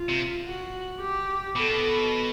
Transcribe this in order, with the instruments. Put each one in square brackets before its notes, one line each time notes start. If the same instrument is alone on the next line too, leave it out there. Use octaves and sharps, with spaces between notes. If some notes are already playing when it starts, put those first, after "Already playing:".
Already playing: [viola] F4
[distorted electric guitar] C3
[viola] F#4
G4
[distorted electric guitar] B2 [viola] A4